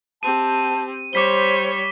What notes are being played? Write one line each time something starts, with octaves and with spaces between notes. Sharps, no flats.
C4 G4 A5 D#7
G3 C5 C#5 D6 B6 G7